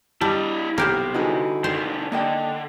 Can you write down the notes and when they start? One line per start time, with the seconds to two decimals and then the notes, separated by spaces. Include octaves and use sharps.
0.21 G3 E4 D#5 A5
0.78 B1 C3 A#3 G4 C5 F6
1.14 D3 D#4 E4 F#4 G#4 B4
1.64 C3 D#3 C5
2.12 D3 A#3 D#5 G5